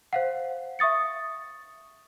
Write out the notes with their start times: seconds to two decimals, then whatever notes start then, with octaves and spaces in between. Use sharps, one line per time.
0.13 C5 F5 F#5
0.79 E5 C#6 D#6 A6 C#7